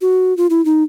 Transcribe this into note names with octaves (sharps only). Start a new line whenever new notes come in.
F#4
F4
E4
D#4